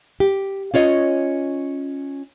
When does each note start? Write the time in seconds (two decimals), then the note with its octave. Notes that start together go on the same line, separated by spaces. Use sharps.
0.20 G4
0.74 C#4 F4 C#5 D#5